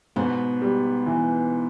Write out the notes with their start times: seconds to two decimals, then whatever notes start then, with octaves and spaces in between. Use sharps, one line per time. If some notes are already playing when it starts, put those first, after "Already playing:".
0.16 G#2 B2 B3
0.62 G3
1.06 E3